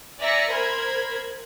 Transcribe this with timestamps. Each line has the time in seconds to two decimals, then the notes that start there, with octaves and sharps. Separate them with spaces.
0.21 D5 E5 G#5 A#5 A#6 C#7
0.51 A#4 C5 B5 G#6